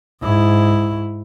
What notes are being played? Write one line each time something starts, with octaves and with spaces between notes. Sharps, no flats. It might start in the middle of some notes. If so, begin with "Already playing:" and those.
G#2 E4